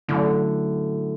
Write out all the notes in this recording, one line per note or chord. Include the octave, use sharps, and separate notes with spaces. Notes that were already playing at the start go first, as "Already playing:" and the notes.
A2 D3 F#3 C#4 E4